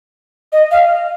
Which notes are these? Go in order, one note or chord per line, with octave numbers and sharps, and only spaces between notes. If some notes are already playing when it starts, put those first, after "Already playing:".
D#5
F5